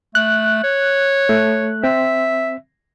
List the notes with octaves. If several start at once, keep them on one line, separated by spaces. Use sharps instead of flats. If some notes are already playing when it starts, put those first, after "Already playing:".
A3 F#6
C#5
A3
C4 E5